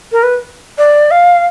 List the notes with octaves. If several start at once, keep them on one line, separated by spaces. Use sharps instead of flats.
A#4
B4
D5
F5